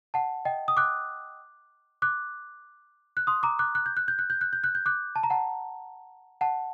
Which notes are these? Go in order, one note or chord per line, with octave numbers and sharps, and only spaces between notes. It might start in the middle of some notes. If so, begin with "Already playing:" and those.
F#5 A5
D#5 G5
D#6
D6 F#6
D6 F#6
F#6
C6 D#6
A#5 D6
D6 F#6
F#6
G6
F#6
G6
F#6
G6
F#6
G6
F#6
G6
D6 F#6
A5
A#5
F#5 A5
F#5 A5